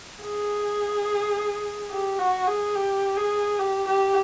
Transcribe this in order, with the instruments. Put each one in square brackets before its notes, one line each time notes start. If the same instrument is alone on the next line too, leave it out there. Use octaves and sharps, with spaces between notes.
[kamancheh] G#4
G4
F#4
G#4
G4
G#4
G4
G4